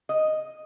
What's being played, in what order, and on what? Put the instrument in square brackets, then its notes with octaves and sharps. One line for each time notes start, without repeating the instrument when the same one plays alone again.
[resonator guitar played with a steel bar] D#5